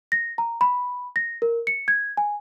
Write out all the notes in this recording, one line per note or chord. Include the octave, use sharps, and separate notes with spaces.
A#6
A#5
B5
A#6
A#4
C#7
G#6
G#5